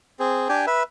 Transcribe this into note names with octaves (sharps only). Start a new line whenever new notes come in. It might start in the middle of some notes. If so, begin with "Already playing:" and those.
C4 G#4
D4 G4 G5 G#5
B4 E5